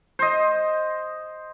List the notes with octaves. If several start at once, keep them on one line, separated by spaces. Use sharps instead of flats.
C5 D#5